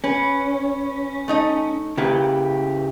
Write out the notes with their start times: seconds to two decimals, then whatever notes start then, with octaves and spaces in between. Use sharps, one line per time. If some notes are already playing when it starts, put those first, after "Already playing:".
0.04 C#4 B4
1.28 A3 D#4 D#5
1.98 C#3 A#3 E4 G4 B4